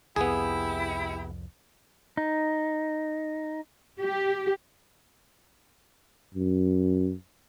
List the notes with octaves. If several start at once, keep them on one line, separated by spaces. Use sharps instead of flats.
C2 F2 B3 E4 G4 G#4
D#4
G4
F#2